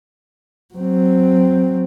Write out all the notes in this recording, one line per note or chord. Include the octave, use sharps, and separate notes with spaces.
F#3 C4